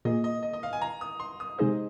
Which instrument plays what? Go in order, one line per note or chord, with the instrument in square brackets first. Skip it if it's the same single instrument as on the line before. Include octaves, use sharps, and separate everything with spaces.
[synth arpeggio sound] A#2 A#3 G#4 [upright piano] D#5
[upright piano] D#5
D#5
D#5
F5
G#5
A#5
D#6
C6
D#6
[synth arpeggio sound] C3 G#3 D#4 G#4 D#5 [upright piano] C5